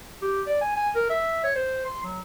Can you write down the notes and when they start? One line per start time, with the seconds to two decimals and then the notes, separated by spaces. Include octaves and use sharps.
0.22 G4
0.47 D5
0.61 G#5
0.76 G#5
0.95 A#4
1.10 E5
1.44 C#5
1.56 C5
1.86 C6
2.04 F#3